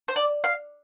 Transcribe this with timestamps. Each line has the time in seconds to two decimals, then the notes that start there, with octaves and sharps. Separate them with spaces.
0.08 C5
0.16 D5
0.44 F5